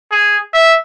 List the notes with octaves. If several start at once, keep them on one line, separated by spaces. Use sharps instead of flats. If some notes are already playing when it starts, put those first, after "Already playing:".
G#4
E5